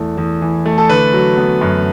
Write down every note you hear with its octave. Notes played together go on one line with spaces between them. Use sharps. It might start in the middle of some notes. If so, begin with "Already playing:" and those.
Already playing: E2 E3 A3
E2
E3
A3
A4
D3 B4
F#3
B3
F#2